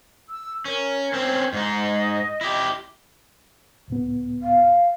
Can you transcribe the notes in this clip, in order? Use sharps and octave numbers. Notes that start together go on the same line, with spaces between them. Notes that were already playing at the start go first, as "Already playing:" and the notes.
E6
C#4 A#4
C4 C#4
G#2 D#4 D#5
E4 G4
C#2 A2 B3
F5